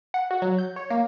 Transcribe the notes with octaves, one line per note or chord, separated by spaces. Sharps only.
F#5
F#4
F#3
G6
C#5
A#3